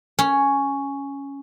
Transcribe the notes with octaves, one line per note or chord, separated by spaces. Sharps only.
C#4